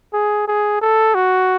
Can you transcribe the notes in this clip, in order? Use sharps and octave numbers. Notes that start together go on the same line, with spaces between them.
G#4
G#4
A4
F#4